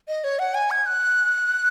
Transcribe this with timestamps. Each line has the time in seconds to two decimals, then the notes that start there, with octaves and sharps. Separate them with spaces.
0.08 D#5
0.24 C#5
0.39 F#5
0.54 G#5
0.71 G#6
0.86 F#6